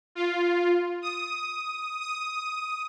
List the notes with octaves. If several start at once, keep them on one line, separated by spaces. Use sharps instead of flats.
F4
D#6
D#6